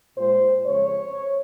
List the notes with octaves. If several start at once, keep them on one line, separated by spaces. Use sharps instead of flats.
A#2 G#3 C5
F2 C#3 G#3 C#5